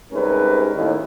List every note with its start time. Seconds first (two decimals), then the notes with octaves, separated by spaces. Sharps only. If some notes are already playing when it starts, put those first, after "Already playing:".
0.13 G#2 C3 G3 C#4 A#4 B4
0.75 D#2 A2 D#3